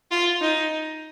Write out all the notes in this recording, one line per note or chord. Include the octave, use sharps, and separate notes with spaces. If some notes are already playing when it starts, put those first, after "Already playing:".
F4
D#4